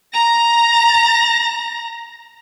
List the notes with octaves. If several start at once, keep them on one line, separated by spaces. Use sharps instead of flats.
A#5 A#6